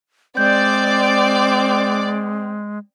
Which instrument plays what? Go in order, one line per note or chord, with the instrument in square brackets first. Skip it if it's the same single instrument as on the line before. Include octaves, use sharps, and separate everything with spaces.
[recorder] G#3 [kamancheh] C4 [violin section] D5 D6 [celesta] G6